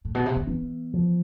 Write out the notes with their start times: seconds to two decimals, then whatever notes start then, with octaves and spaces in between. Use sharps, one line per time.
0.05 A2
0.15 B2
0.26 C3
0.36 D3
0.47 E3 B3
0.94 F3